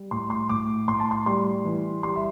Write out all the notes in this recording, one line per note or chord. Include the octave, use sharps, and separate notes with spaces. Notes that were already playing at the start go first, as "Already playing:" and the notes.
Already playing: G3
A2 C6
C6
A2 D6
A2 C6
A5
C6
G3 C6
E3
G3 C6
E5